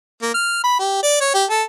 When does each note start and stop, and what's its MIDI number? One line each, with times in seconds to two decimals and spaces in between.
0.22 0.31 58
0.34 0.62 89
0.63 0.78 83
0.79 1.02 67
1.03 1.19 74
1.21 1.30 73
1.34 1.45 67
1.50 1.63 69